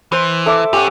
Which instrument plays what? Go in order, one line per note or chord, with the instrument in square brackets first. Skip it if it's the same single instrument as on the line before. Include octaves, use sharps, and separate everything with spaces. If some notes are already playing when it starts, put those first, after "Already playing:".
[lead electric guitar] E3 [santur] C5
[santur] A4 E5 D6
[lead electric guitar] F#2 C#4 [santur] G4 F#5